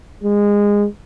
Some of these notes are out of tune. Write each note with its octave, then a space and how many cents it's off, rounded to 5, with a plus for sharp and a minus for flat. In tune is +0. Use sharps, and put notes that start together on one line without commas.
G#3 -20